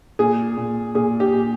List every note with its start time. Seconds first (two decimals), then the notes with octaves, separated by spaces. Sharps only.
0.19 A#2 G#4
0.57 A#2
0.95 A#2 G#4
1.20 G4
1.33 A#2